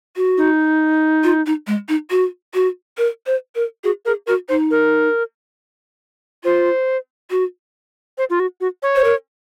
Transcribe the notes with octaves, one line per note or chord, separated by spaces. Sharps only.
F#4
D#4
F4
D#4
G#3
D#4
F#4
F#4
A#4
C5
A#4
F#4 G#4
G#4 A#4
F#4 A#4
D#4 C5
A#4
F4 C5
F#4
C5
F4
F#4
F#4
C#5
C5
A#4